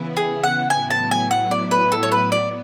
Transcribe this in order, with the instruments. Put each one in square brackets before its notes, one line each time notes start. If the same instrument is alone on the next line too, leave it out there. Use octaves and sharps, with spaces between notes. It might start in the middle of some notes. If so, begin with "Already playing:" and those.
Already playing: [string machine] C#3 E3 B3 E4
[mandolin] G#4
F#5
[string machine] A2 F#3 B3 E4 [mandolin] G#5
[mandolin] A5
G#5
F#5
D5
B4
A4
C#5
B4
[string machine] B3 [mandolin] D5